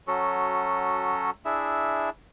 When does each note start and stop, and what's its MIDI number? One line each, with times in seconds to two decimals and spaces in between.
0.07 1.30 54
0.07 1.30 61
0.07 1.30 66
0.07 1.30 69
1.45 2.10 62
1.45 2.10 64
1.45 2.10 68
1.45 2.10 76